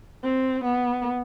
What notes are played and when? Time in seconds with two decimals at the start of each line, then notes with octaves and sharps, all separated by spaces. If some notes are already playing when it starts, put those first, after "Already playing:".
0.24 C4
0.64 B3